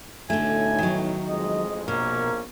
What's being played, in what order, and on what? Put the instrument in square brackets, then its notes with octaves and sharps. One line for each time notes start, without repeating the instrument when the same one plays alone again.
[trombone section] B1 A2 [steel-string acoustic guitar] D3 A3 [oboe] G#5
[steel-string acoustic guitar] D#3 F#3
[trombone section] A1 F2 G#3 [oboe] D#5
[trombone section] A#1 A#3 A#4 [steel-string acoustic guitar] B2 [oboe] C#4